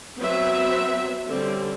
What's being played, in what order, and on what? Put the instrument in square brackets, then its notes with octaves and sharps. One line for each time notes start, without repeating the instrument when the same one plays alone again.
[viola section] F#3 B3 C4 B4 E5
D3 G3 C4 C#4